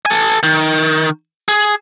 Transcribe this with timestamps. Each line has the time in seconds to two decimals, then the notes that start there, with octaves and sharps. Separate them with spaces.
0.06 A4 G#5
0.43 D#3
1.48 G#4